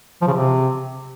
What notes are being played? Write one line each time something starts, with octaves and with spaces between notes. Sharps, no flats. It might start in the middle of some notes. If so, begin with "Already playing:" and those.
F3
C#3
C3